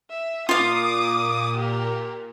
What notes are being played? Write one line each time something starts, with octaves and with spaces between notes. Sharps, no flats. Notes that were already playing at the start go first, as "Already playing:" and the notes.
E5
A#2 F4 F5 D6 D#6
G4 A#4